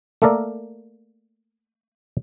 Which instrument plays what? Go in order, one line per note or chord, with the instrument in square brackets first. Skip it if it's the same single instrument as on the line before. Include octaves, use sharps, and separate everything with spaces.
[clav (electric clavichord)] A3 A#3 A4 A#4 D5